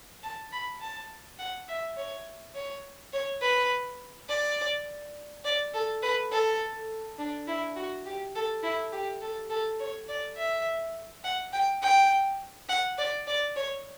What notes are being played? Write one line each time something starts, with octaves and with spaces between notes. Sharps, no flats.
A5
B5
A5
F#5
E5
C#5
C#5
C#5
B4
D5
D5
A4
B4
A4
D4
E4
F#4
G4
A4
E4
G4
A4
A4
C#5
D5
E5
F#5
G5
G5
F#5
D5
D5
C#5